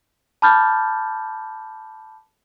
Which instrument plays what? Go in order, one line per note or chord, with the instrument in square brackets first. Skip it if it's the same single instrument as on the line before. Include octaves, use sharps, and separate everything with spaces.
[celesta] A5 B5 D6 F6 G6 A6